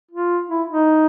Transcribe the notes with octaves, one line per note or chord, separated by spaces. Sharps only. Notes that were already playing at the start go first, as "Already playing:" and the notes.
F4
E4
D#4